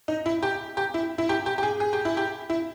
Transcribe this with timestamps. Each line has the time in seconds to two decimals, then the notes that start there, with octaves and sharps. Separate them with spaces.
0.08 D#4
0.26 E4
0.43 G4
0.77 G4
0.94 E4
1.18 E4
1.29 G4
1.46 G4
1.58 G4
1.63 G#4
1.80 G#4
1.93 G4
2.05 E4
2.17 G4
2.50 E4